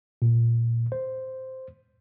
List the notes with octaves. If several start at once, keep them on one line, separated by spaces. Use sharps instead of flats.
A#2
C5